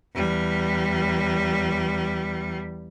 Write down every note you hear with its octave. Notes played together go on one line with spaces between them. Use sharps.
E2 G3